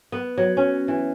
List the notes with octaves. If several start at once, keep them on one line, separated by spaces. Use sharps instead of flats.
B3
F#3
C#4
E3